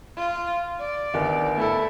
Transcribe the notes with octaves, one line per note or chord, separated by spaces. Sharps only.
F4
D5
G1 D#3
A3 E4 A4